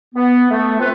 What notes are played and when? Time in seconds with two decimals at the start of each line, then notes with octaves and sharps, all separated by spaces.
0.15 B3
0.50 A3
0.79 C4 F4 B4